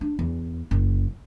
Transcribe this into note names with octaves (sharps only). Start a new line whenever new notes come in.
D4
E2
F#1